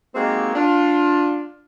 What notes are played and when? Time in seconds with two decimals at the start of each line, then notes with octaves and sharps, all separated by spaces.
0.15 G#3 A#3 C4 D#4 F#4 G4
0.55 D4 F4